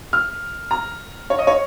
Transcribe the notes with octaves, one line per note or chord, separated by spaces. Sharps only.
F6
A#5
C#5
D#5
C#5